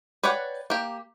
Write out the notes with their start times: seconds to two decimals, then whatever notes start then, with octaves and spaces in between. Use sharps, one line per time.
0.24 B4 C#5 D5 F#5 G5
0.70 A#3 G4